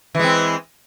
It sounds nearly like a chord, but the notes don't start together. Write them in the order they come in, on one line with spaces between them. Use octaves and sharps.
E3 G#3 C4